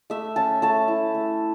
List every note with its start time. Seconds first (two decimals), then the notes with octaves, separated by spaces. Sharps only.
0.10 A3 E5
0.36 C#4 A5
0.62 A3 A5
0.88 E4
1.14 A3